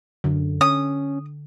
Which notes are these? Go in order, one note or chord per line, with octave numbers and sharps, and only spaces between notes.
F#2 D3
C#4 D#6